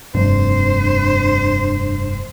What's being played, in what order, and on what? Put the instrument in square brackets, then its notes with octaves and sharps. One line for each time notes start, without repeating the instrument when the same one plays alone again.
[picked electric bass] F1 [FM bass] G2 [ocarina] D4 [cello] C5